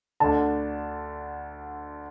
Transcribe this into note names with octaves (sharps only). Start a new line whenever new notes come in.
D2 D3 A5